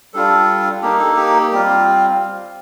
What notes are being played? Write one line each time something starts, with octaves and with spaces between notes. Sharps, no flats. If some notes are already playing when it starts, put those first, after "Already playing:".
G3 D4 F4 A4
A#3 D#4 G4
A4
G4
G3 C4 F4